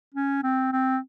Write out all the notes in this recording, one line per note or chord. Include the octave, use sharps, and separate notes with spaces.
C#4
C4
C4